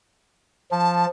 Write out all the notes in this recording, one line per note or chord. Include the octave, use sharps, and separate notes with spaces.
F3 A5